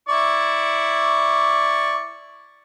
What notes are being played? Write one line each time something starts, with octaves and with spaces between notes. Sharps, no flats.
E4 D5 C#6